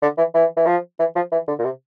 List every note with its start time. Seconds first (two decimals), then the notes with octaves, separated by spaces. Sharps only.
0.02 D3
0.18 E3
0.35 E3
0.57 E3
0.66 F3
0.99 E3
1.16 F3
1.32 E3
1.48 D3
1.59 A#2
1.64 C3